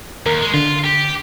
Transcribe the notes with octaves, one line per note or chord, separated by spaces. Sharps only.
D#2 A#4
G#3
D3 F4
G4